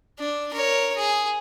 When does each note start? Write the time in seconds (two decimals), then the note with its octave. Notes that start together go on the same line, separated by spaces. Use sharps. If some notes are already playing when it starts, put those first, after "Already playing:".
0.19 D4
0.54 A#4 C#5
0.96 G#4